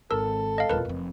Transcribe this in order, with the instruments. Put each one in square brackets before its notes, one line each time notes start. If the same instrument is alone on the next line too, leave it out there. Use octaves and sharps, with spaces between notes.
[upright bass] G#1 [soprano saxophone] A4 [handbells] A#4 E6
[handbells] D#5 F5
[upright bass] D#1 F4 [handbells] A#4 B4
[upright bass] F1 F2